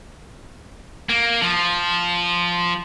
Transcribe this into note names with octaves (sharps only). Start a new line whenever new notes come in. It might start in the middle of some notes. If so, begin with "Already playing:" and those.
A#3
F3